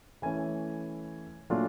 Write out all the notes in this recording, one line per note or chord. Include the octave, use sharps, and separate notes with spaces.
E3 A3 C#4 E4 G#5
A#2 F#3 A3 D4 F4